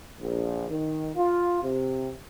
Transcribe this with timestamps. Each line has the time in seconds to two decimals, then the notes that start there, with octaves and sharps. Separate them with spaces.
0.19 A#1
0.68 D#3
1.16 F4
1.62 C3